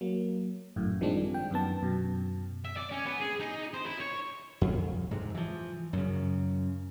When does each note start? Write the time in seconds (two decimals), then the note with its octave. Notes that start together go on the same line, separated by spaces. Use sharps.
0.01 F#3 A#3
0.76 G#1 F#2 A2
1.01 D#3 F3 G3 G#3 C4 D4
1.34 G5
1.51 F#2 D#3 B3 A5
1.83 F#2 B2
2.65 E5
2.77 D5
2.91 C#4
3.06 B3
3.20 G#4
3.40 D#4
3.74 C5
3.86 E4
4.00 C#5
4.61 F2
5.11 G#2 C3
5.34 E3 F3
5.93 F#2 C#3